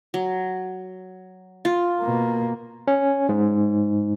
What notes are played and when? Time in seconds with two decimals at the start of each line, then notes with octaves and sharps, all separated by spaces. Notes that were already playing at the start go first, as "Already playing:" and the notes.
0.14 F#3
1.65 F4
2.01 B2 A#3
2.88 C#4
3.29 G#2